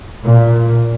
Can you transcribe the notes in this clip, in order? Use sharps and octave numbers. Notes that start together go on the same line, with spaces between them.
A#2